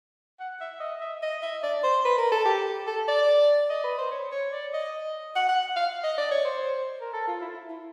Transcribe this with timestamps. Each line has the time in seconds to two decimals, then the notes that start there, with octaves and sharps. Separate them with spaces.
0.40 F#5
0.60 E5
0.80 D#5
1.01 E5
1.22 D#5
1.42 E5
1.63 D5
1.83 C5
2.05 B4
2.18 A#4
2.31 A4
2.45 G4
2.87 A4
3.08 D5
3.70 D#5
3.84 B4
3.98 C5
4.11 C#5
4.32 C#5
4.52 D5
4.73 D#5
5.35 F#5
5.49 F#5
5.76 F5
6.04 D#5
6.18 D5
6.31 C#5
6.45 C5
7.01 A#4
7.13 A4
7.28 F4
7.41 E4
7.55 E4
7.69 E4